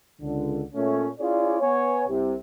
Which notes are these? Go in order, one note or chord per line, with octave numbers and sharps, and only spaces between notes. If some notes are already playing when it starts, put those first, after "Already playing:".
C#2 D3
A#2 A3 C#4
C#4 E4 F4 G#4 C#5 D5
B3 C#5 G#5
C2 C3